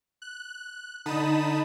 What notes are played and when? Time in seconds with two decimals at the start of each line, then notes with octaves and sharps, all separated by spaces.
0.22 F#6
1.06 D3 D#4 A5 B5 D#6 E7